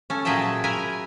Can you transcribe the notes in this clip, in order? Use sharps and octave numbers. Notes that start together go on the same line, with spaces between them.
C#4 A4
A#2 F#3 G#4 E5 G5 A5
A#4 B4 E5 G#5 A#5